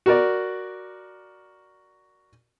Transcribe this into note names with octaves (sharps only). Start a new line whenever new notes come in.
F#4 A#4 D5